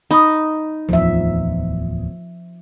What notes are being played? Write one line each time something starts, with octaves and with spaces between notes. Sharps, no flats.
D#4 B5 D#6
D1 E2 F3 E5